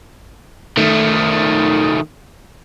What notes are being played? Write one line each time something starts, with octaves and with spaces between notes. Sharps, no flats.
D#3 A3